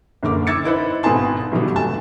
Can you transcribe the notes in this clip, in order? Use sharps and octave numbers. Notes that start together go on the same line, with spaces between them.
F#1 D3 A#4 D6
D6 E6 G#6 A6 C#7
D#4 E4 B4 C5
G#1 B2 B4 G#5 A5 C6
G2 B2 D3 F#3 G3
F1 A5